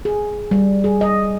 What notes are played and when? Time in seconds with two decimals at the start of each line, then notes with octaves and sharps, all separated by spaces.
0.05 G#4
0.51 G3
0.84 G#4
1.01 D#5